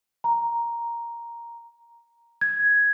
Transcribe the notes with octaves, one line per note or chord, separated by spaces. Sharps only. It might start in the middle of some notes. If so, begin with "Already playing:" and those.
A#5
G#6